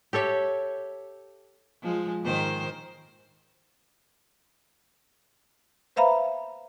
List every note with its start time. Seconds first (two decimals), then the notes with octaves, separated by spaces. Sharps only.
0.13 G4 A4 C#5 E5
1.82 F3 G#3
2.23 G#2 D#3 C5
5.96 B4 C5 E5 F5 A#5 B5